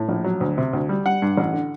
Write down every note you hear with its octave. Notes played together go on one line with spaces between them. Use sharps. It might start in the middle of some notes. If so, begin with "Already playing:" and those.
Already playing: A2
A#1
F#3
D2
C3
D2
G3
G3 F#5
G2
A1
D3